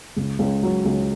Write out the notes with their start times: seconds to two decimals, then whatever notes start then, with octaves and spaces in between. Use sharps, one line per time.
0.16 C#2
0.39 C#2
0.63 F#3
0.85 C#2